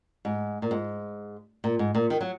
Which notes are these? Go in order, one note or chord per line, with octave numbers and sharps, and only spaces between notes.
G#2
A#2
G#2
A#2
G#2
A#2
D#3
F#3